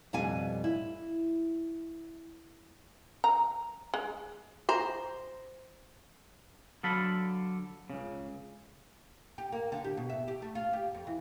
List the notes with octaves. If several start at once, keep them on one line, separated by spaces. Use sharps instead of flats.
F2 B2 G3 F5 G#5
E4
A#5
G#3
C5 A#5
D3 F#3 A4 F5 A5 B5
C#2 C#3
G4
A#3
D3
G4
B2
E5
G4
A3
F4
G4
F2
E3